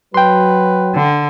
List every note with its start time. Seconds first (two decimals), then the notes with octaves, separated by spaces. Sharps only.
0.14 F#3 B4 G5 C6
0.95 D3